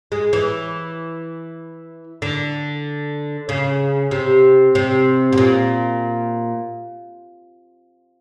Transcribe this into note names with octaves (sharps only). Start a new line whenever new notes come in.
G#3
E3
D3
C#3
C3
C3
B2
A#2